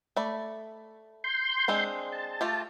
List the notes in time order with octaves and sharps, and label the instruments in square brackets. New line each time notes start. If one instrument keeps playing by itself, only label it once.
[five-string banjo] A3 D5 B5
[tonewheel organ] C6 G6
[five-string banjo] G#3 C4 D4
[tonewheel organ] A5
[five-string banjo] A3 F4 G4